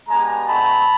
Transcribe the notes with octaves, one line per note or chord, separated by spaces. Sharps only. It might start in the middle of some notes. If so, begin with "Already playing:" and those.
G#3 B3 D4 G4 G#5 A#5
A3 C4 D#4 F#4 A5 B5